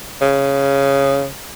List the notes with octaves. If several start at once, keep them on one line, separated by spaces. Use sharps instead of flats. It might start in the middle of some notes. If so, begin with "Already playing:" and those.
C#3